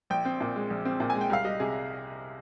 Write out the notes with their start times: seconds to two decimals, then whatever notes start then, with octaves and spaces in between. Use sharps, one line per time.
0.10 A#1 G5
0.25 C4
0.40 A#2
0.56 G#3
0.70 A#1
0.85 C4
1.00 A#2
1.10 G#5
1.15 G#3
1.21 G5
1.30 C2 F5
1.45 G3 D#5
1.60 C3 G#4